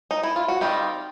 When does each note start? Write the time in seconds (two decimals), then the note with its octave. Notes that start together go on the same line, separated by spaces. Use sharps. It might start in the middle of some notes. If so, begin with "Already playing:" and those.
0.11 D#4
0.23 E4
0.36 F4
0.48 F#4
0.61 D#3 G3 C4 D#4 F4 G4